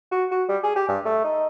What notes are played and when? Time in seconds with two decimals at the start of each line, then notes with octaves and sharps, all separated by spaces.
0.11 F#4
0.31 F#4
0.49 G3
0.63 G#4
0.75 G4
0.88 G2
1.05 A3
1.24 D#4